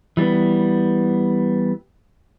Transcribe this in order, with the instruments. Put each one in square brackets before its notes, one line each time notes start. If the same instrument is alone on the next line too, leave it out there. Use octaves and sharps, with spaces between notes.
[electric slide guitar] E3 G3 A#3 B3